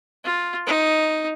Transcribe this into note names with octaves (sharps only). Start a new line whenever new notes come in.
F4
D#4